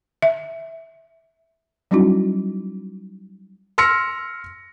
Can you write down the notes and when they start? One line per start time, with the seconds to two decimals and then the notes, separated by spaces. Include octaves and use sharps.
0.22 E5
1.91 F#3 G3 C#4 D#4 E4 F#4
3.78 C6 E6 F6 A#6 C#7